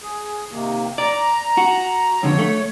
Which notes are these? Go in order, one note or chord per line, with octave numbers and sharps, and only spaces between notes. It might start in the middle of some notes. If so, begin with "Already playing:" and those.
G#4
C3 D#3 A#3
D5 A#5
F#4
F2 D3 C#5
A3